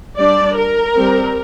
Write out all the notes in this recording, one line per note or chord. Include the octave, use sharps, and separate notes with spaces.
G3 D4 D5
A#4
G3 C4